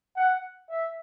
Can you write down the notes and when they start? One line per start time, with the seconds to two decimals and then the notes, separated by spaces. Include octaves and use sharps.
0.16 F#5
0.70 E5